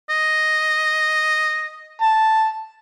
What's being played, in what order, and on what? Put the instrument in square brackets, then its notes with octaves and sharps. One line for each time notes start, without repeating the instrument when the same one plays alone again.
[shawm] D#5
[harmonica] A5